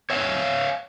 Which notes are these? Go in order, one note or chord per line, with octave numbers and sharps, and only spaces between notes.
C#5 E5 F5